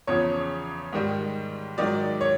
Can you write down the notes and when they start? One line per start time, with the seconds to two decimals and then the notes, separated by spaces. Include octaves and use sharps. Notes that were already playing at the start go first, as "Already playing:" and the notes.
0.07 E2 C#3 F3 C#5
0.93 G#2 D#3 G3
1.78 G#2 D#3 F#3 D5
2.21 C#5